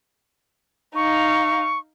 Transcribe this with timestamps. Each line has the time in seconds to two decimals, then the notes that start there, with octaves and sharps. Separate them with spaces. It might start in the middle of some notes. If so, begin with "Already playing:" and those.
0.95 D#4 F5 C#6